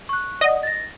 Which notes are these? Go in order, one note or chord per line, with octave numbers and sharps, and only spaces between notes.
C#6 F#6
D5 D#5 F#5
A6 A#6